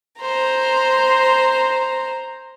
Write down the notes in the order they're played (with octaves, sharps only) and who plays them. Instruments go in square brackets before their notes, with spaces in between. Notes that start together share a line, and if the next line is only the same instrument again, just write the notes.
[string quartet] C5 A#5